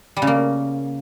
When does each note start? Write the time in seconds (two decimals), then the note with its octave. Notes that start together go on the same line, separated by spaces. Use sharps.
0.16 G3
0.22 C#3
0.27 A#3